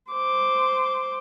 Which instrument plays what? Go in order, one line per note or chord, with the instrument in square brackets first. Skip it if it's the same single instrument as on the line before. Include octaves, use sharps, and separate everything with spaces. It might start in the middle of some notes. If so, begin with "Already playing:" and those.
[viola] C5 D6